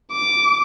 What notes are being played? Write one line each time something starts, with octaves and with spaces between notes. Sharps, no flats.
D6